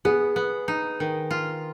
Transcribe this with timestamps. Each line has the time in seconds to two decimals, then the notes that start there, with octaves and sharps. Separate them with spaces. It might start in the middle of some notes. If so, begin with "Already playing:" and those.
0.05 B3 G#4
0.36 B3
0.68 D#4
1.00 D#3
1.31 F4